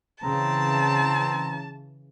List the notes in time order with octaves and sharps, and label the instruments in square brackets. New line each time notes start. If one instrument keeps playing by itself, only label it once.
[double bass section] C#3 E3 [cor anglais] C4 [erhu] A5 [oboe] A#5